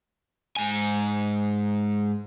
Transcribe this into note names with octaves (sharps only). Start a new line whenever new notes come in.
G#2 G#5